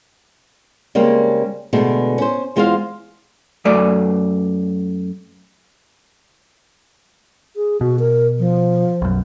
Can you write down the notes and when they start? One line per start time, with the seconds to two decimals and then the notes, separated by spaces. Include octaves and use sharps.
0.95 C#3 G3 G#3 A#3 C4
1.73 B2 D3 G#3 A3
2.18 C#4 C5
2.56 E2 G#3 F4 C5 D#5 F5
3.65 F#2 A3 D5
7.56 G#4
7.81 B2 F#4
8.00 A#4
8.39 F3
9.02 B1 F#2